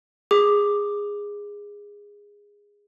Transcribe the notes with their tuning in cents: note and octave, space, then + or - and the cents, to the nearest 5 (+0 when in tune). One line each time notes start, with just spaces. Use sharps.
G#4 -15 D6 +5